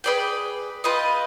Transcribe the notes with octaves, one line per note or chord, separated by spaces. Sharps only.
G#4 B4 D5 G5
F4 B4 D#5 G5